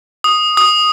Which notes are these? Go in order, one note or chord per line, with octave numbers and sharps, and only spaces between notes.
D#6
D#6